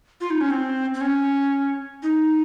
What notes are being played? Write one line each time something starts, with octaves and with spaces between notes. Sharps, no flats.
F4
D#4
C#4
C4
C4
C#4
D#4